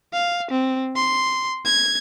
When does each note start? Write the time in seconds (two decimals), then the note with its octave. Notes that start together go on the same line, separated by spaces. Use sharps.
0.13 F5
0.51 C4
0.96 C6
1.65 G#6